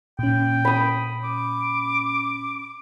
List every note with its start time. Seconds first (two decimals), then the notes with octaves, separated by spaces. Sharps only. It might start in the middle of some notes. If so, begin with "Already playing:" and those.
0.19 A#2 C#4 G5
0.65 B5 D#6
1.24 D6